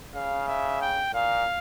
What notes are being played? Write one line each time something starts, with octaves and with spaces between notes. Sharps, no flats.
C#3 F5
E5
G5
A#2 F5